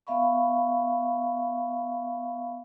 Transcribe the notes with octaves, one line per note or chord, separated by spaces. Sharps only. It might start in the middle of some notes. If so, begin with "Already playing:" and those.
B3 E5 F5 B5 C#6